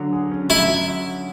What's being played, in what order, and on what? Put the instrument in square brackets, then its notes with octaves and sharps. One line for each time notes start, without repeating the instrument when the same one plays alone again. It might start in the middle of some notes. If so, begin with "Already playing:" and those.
Already playing: [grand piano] D3 F#3
G#4
C#4
[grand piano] F#3 [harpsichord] E4